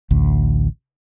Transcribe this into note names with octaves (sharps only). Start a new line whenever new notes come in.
A1 D2